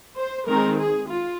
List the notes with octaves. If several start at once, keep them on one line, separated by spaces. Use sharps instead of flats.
C5
D#3 G#3 C4 A#4
G#4
F4